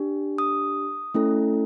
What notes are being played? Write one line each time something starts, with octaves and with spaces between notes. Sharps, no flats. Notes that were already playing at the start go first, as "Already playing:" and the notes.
Already playing: D4 G4
D#6
A3 C#4 E4 A4